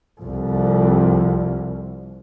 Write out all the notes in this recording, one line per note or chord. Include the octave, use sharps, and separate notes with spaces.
C2 F2